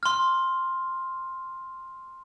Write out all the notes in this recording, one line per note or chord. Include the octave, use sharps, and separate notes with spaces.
C6 F6